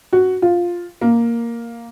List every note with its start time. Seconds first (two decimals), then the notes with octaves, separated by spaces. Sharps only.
0.13 F#4
0.42 F4
1.01 A#3